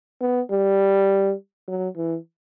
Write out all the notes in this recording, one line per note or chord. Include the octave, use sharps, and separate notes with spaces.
B3
G3
F#3
E3